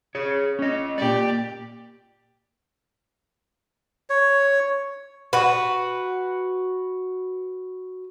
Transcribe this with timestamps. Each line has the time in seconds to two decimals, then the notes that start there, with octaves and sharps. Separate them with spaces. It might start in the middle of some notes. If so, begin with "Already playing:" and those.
0.15 G#4 C#5
0.59 C#4 D#5
0.98 A#2 G4 D5
4.10 C#5
5.33 F#4 B4